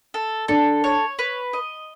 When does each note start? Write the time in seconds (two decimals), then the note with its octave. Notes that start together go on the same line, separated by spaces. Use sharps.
0.14 A4
0.48 D4 A4
0.84 C#5
1.19 B4
1.53 D#5